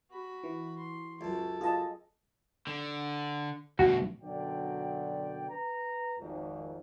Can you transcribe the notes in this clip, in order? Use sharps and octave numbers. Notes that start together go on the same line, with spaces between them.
F#4 B5
E3
C6
C#2 F#2 A4
F4 G#4 D#5 A5
D3
D2 B2 F#4
F#2 B2 D3 F#3 D5 G5
B4 A#5
G#1 F2